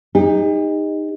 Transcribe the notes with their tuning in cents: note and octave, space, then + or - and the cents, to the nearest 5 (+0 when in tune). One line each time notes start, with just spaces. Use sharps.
D#4 +0 G4 +45